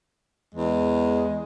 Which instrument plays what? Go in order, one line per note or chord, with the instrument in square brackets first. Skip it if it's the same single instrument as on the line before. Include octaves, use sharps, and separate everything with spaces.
[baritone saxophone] E2 [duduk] G#3